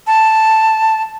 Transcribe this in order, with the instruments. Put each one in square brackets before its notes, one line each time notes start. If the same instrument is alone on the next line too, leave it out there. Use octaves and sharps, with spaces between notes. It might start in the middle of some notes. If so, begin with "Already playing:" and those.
[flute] A5